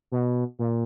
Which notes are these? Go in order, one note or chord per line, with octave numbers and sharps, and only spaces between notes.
B2
A#2